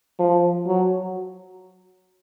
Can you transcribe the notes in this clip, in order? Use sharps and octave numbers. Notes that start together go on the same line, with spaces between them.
F3
F#3